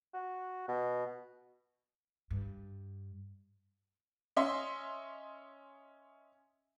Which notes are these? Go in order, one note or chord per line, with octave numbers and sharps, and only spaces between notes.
F#4
B2
G2
C#4 D#5 E5 C6